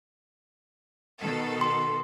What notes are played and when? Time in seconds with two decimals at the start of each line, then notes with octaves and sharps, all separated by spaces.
1.20 B2 D#3 A4
1.61 C6